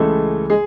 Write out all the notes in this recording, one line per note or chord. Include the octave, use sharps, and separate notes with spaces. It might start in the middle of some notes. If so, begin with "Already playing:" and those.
Already playing: C#2 C#3 E3 G#3 A3 A4
G#3 G#4